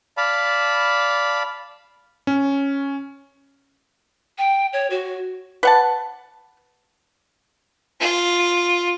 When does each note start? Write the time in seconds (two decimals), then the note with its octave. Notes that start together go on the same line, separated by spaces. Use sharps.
0.17 D5 F5 A5 B5
2.27 C#4
4.38 G5
4.73 C#5
4.90 F#4
5.63 B4 F#5 A5
8.00 F4